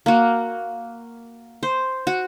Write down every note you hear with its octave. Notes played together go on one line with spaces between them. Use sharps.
A#3 F#4
C5
F#4